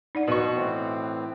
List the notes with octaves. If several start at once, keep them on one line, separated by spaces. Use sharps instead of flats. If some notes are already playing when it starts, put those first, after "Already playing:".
D#4 D5 F#5
B2 D#3 F3 C#6
A2 E3 C4